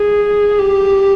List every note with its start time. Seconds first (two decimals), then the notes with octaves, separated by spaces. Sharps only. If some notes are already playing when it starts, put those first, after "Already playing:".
Already playing: G#4
0.59 G4